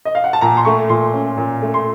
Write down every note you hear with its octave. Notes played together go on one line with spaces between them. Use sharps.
D#5
F5
F#5
A5
A#2 A#5
C6
A3 C#6
A#2 C6
C#4
A#2
A3
C6